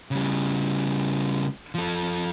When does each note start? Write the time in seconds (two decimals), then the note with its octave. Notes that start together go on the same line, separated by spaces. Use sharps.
0.11 C#3 G3
1.75 F3 A4